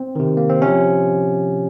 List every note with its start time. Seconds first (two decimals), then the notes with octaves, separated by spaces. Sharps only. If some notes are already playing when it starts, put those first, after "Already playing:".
Already playing: C4
0.16 C3 D#3
0.37 A#3
0.49 C4
0.62 C3 F3 C#4